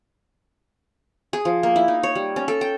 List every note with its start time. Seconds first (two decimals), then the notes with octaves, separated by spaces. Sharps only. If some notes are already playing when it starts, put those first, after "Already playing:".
1.33 G#4
1.45 F3
1.63 A#3
1.76 E4
1.88 D#4
2.03 C#5
2.15 G3
2.36 C#4
2.48 A4
2.61 G5